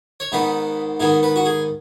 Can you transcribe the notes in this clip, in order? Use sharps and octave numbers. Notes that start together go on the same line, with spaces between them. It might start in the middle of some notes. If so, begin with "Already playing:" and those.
C#5
G#2 D#3 B3 B4
G#2 D#3 B3 G#4
B4
F#4
G#4